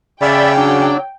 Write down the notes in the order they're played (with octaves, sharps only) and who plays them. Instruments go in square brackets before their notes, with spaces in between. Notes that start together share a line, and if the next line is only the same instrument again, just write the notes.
[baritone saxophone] C#3 [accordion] D5 E5 B5 [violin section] G5
[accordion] F#3 [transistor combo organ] D4